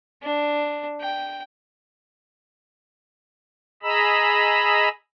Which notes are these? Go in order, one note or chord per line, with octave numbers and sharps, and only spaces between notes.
D4
G5
G#4 D#5 A#5 B5 E6